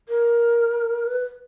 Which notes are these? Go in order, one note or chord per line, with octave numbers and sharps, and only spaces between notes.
A#4
B4